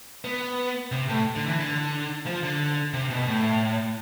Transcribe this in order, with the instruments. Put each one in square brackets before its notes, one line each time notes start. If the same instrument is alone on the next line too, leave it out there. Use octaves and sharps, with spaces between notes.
[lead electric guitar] B3
C3
A2
D3
E3
D3
F3
D3
C3
B2
A2